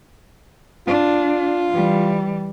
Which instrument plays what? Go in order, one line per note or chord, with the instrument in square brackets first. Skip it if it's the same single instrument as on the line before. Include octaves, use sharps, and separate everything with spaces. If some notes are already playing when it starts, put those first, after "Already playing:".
[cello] D4 [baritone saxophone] F4
[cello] E3 G3